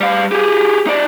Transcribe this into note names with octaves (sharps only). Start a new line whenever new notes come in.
G3 F5
G4 G#4
D#4 D5